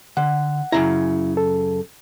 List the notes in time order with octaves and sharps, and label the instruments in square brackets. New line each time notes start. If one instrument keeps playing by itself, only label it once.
[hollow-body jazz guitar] D3 [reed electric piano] F#5
[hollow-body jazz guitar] F#2 C#3 A#5 [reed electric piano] E4
[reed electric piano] A4